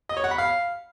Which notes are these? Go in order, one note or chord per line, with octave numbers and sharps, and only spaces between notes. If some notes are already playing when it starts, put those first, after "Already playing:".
D#5
C#5
F#5
B5
F5